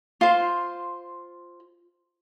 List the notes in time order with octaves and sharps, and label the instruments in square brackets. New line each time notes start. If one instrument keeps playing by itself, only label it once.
[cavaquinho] F4 C5